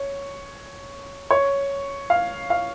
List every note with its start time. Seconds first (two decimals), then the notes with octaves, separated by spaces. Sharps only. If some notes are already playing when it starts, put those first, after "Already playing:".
Already playing: C#5
1.31 C#5
2.10 F5
2.50 F5